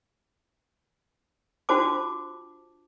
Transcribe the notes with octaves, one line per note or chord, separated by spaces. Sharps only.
D4 F4 F#4 C5 A5 D6